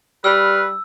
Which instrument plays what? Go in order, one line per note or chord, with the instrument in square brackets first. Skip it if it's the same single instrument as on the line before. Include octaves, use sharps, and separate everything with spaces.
[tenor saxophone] G3 [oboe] B4 [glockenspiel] E6 [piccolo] F6